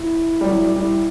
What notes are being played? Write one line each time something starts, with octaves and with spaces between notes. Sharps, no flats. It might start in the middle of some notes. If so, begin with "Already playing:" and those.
Already playing: E4
G3
F#3 E4
G3
G3 E4